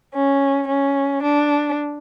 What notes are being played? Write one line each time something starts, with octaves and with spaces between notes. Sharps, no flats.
C#4
C#4
D4